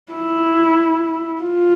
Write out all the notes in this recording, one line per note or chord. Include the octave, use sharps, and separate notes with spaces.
E4
F4